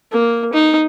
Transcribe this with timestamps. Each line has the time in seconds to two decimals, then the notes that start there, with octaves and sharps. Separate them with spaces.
0.12 A#3
0.53 D#4